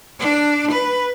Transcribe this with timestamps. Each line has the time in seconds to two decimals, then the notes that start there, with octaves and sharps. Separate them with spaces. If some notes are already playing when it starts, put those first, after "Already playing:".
0.19 D4
0.71 B4